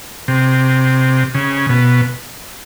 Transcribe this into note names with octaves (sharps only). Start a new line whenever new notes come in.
C3
C#3
B2